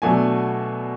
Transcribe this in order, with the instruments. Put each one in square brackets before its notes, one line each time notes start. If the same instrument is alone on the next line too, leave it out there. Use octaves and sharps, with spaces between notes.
[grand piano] B2 F#3 A3 D4 G#5